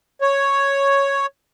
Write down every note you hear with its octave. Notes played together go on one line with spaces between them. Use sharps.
C#5